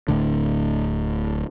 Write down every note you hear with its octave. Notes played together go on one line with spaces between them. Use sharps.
D1 A2 D3